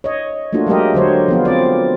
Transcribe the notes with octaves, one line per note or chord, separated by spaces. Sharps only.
C#5 D#5
A3 A#3 D4 F4 F#4
F#3 G#3 A3 G4 A#4 D#5
D3 F#3 C5 C#5
F3 B3 F4
C4 F4 D5